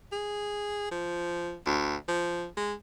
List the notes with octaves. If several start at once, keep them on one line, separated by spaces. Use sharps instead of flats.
G#4
F3
D2
F3
G#3